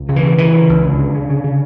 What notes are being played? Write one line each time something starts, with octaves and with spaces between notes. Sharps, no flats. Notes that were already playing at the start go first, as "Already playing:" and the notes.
Already playing: C#2
C#3
E3
C#3
C#3 E3
C#3
C#2
C#2 D3
C#3
C#3
C#3
C#3